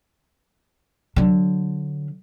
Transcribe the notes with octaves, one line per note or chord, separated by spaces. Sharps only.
D3 F#3